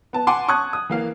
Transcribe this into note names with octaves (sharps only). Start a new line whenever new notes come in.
B3 A5
F#5 G#5 A5 C6 D6
A5 C#6 D#6 F#6 G#6
D#6
E3 A#3 F5